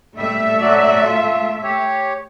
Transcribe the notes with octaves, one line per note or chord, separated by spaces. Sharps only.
G3 A3 E5
F#3 F#4 D5
F4
G4 C#5